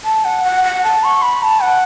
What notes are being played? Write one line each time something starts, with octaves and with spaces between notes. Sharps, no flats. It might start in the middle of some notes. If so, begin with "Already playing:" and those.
A5
F#5
F#5
F#5
A5
C#6
B5
A5
F#5